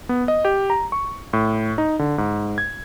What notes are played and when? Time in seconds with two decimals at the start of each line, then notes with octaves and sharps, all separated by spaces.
0.09 B3
0.28 D#5
0.45 G4
0.70 A#5
0.92 C#6
1.33 A2
1.78 D#4
1.99 D3
2.18 G#2
2.58 G#6